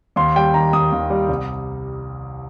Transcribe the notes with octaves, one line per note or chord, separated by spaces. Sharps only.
D#2 C6
G3 G5
D#3 A#5
D#2 D#6
D#2
G3
C2